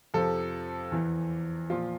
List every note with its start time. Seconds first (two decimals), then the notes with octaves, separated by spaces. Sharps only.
0.14 F2 C3 F3 A4
0.92 E2 E3
1.70 A#2 F3 F4